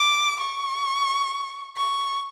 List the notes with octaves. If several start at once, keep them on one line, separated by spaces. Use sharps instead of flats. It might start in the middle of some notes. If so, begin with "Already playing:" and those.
Already playing: D6
C#6
C#6